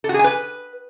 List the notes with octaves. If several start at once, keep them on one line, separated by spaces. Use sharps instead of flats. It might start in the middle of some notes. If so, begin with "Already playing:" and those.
A4
F#4
G#4
G#5
B4